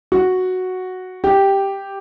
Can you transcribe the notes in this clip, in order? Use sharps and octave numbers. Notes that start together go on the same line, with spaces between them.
F#4
G4